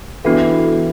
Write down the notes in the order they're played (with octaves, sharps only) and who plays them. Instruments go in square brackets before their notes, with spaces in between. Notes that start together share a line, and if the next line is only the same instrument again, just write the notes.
[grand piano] E3 [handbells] B3 D4 F#4 A4